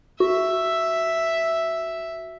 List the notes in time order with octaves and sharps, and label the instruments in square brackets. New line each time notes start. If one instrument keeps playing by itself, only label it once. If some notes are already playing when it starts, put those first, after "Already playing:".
[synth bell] F#4 [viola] E5